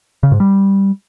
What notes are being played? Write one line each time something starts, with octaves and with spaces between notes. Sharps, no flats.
C#3
G#2
G3